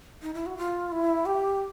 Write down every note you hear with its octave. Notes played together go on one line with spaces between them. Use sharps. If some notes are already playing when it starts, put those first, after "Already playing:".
D#4
E4
F#4
F4
E4
G4